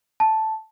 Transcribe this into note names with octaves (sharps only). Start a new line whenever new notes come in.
A5